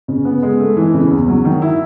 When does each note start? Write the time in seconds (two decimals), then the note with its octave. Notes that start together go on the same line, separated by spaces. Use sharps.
0.08 C#3
0.25 B3
0.43 G#3
0.59 A3
0.77 E3
0.94 C#3
1.11 E2
1.28 F#3
1.45 D#3
1.62 E4